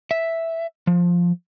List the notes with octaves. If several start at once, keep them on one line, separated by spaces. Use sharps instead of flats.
E5
F3